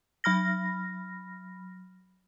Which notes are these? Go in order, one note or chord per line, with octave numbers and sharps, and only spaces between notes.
F#3 B5 F6 A#6